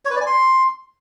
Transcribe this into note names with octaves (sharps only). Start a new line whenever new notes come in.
C#5
B4
D5
G#5
C6